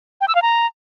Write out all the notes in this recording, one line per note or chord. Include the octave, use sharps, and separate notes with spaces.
G5
E6
F5
A#5